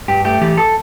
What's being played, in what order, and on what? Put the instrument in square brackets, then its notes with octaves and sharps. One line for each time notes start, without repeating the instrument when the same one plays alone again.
[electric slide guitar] G2 G4
A3 G4
E3 G4
A4